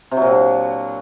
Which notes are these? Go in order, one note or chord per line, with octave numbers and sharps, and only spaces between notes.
C3
F#3
A#2
F#3
D4